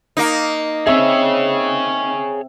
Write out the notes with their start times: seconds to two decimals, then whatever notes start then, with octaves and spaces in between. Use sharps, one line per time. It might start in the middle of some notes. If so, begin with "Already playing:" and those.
0.17 A#3 D#4
0.87 C4 G#4 C#5 E5